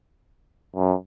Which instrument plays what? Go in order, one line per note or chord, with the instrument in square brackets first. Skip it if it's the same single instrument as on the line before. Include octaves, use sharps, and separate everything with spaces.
[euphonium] F#2